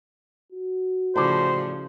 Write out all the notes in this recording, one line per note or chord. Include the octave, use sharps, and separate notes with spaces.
F#4
A2 C#3 F3 C5 D5